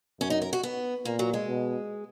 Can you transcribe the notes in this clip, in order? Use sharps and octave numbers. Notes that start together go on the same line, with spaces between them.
F#2 C#4
D#4
A#4
F#4
B3
A#2 A#3
F#3
G#3
B2